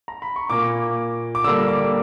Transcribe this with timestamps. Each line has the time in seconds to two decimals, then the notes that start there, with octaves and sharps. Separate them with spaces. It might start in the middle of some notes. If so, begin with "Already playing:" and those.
0.08 A#5
0.22 B5
0.36 C#6
0.50 A#2 A#3 D6
1.35 D6
1.44 D3 E6
1.47 G3 A#3
1.68 D6